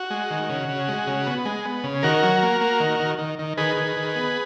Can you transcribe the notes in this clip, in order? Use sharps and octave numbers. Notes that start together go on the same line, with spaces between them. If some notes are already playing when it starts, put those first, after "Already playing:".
Already playing: F#4
G#3
D#3
C#3
C#3
G#3
C#3
B3
G#3
B3
C#3
D#3 F#4 A#4
F#3
A#3
A#3
D#3
D#3
D#3
D#3
D#3 G#4 B4
D#3
D#3
B3